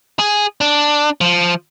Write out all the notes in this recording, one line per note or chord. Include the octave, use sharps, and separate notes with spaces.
G#4
D4
F3